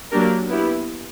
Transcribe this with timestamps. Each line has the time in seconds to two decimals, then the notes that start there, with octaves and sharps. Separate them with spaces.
0.10 F#3 A#3 D4 G4 A#4
0.48 B3 E4 G4